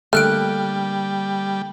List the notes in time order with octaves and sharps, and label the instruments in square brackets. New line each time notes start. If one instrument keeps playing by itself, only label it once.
[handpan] D3 A#3 [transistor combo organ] G3 [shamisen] A3 [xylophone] F6 F#6 D7